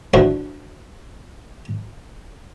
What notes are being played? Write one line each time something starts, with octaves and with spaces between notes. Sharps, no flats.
D3 F3 E4 F#4 B4 C5